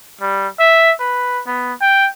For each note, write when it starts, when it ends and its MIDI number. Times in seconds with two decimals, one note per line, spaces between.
0.21 0.48 55
0.59 0.92 76
1.00 1.41 71
1.47 1.73 59
1.81 2.09 79